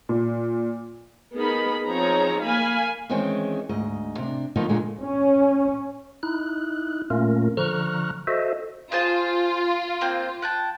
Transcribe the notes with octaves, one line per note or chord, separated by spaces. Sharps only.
A#2
B3 D#4 G#4 A#4 B5
F3 C4 D#4 G#4 C#5 A#5
A#3 F5 G#5 B5
D#3 E3 G#3 C4 C#4 G5
D2 G#2 D#5
C3 D4
D3 D#3 F3 A#3 B3 D#4
A#2 D3 G#3
C#4
D#4 E4 F#6
A#2 A3 A#3 C#4 F4 A#4
D3 F3 A#5 C#6 F6 F#6
F#4 A4 C5 D#5 E5
F4 G#4 C5 A5
A#3 C4 C5
F#5 G5 A5